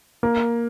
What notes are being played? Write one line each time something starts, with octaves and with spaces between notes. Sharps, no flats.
A#3